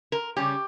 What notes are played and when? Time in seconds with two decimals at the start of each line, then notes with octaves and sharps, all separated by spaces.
0.12 A#4
0.37 C#3 G3 C#4 G4